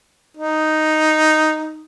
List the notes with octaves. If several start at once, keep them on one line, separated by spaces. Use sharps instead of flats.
D#4